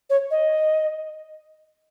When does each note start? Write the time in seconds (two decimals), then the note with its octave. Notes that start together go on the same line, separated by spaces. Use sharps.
0.10 C#5
0.31 D#5